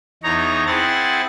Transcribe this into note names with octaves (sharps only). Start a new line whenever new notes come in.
E2 D#4 C#5 A#5
C4 E4 G#4 F#5 A6